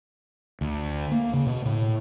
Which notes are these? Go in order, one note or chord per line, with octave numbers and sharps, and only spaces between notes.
D2
A#3
C#3
B2
A2